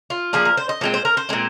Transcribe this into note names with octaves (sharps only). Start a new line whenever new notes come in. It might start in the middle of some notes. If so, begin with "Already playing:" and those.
F4
F3 A#3 D4 G#4
A#4
C5
D#5
A#2 G#3 C4 C5
C5
A#4
C5
A#2 G#3 C4